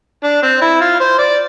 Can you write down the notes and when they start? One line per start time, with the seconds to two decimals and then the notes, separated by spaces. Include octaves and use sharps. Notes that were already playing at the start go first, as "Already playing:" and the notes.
0.23 D4
0.42 C4
0.62 E4
0.81 F4
1.00 C5
1.19 D5